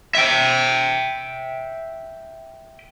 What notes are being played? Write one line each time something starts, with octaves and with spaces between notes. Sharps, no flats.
E5 G5